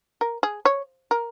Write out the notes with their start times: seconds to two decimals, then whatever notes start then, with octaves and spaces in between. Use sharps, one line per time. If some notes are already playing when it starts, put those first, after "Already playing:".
0.21 A#4
0.43 G#4
0.65 C#5
1.11 A#4